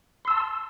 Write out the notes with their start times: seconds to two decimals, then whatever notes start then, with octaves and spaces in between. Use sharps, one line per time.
0.25 C6
0.28 E6
0.30 A5